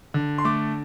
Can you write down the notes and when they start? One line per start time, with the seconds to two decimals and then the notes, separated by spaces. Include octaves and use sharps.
0.14 D3
0.38 C6
0.45 A3 D6